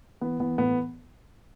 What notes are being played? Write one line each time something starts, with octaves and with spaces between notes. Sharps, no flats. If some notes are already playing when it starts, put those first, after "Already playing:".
E3 B3
E3 B3
A2 B3